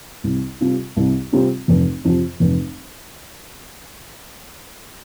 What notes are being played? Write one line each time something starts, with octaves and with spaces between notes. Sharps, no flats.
C2
C3 G3 C4 F4
C2
C3 G3 C4 F4
F1
F2 C3 F3
F1